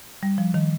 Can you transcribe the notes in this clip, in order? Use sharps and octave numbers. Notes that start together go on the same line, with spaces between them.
G3
F3
D#3